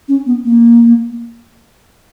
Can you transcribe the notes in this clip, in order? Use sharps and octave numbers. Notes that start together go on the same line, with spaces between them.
C#4
B3
A#3